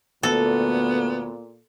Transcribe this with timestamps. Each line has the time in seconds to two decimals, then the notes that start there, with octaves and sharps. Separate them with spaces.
0.23 D2 A#2 B3 A4